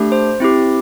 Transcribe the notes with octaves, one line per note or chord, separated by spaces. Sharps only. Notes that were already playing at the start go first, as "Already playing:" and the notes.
Already playing: A3 D4 G4
C5
C4 E4 G4